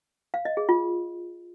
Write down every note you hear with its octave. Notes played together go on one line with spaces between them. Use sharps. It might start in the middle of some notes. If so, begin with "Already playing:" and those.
F5
D#5
G#4
F4